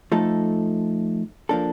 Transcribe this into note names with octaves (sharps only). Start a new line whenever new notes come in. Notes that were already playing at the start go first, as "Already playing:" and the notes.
F3 A3 D#4 A4
F3 A#3 D4 A4